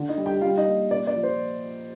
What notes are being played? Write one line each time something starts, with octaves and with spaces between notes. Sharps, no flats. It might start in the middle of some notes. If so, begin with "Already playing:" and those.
Already playing: D3
D#4 D#5
G3
G4 G5
G3 F4 F5
D#4 D#5
A#3
A#2 D5
D5
F3
C5